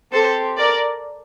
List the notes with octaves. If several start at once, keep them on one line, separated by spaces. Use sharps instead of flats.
C4 G4 A4 C5
A#4 D5